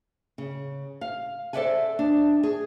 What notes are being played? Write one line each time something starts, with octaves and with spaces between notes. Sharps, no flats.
C#3
F5
A4 C5 D5 E5 F#5 G#5
D4
G#4